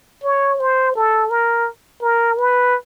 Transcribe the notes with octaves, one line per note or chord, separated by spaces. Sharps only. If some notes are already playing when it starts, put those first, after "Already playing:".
C#5
C5
A4
A#4
A#4
B4